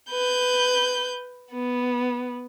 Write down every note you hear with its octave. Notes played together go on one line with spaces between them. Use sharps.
B4 G6
B3